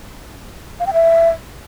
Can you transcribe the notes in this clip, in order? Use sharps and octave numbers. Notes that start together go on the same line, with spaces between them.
F5
G5
E5